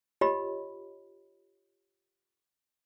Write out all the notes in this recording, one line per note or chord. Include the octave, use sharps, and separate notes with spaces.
F4 G4 C#5 D#5 B5